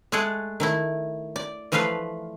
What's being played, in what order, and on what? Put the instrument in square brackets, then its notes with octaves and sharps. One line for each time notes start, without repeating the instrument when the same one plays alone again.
[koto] G#3 A3 G#4 A4 F#5
D#3 A3 E4
D5
E3 F3 A3 F4 B4 F5